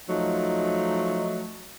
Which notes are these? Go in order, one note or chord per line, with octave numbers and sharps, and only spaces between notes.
F3 F#3 A3 D#4